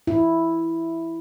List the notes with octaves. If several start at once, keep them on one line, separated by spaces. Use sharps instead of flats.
E4